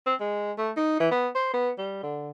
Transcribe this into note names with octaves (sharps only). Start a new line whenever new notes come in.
C4
G#3
A3
D#4
E3
B3
C5
B3
G3
D3